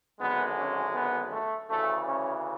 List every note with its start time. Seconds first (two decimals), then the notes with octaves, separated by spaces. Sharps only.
0.20 G#1 F#2 D3 G#3 B3
0.58 C#4
0.94 B3
1.32 A3
1.69 D2 C#3 E3 A3
2.06 C#4